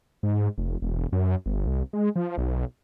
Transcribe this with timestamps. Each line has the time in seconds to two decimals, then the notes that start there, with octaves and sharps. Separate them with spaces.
0.23 G#2
0.58 F1
0.82 E1
1.12 F#2
1.46 G1
1.66 C2
1.93 G#3
2.16 F3
2.37 B1